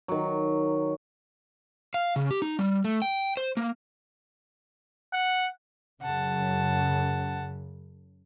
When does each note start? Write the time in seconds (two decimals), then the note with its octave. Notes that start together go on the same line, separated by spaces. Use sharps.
0.08 D#3 F#3
1.94 F5
2.16 C#3
2.31 G4
2.42 D#4
2.59 G3
2.84 A3
3.02 G5
3.37 C5
3.57 A#3
5.13 F#5
6.03 F#2 C#3 F#5 A5